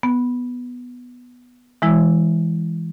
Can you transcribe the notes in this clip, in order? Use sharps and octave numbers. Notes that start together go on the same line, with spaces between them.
B3
E3 G#3 E4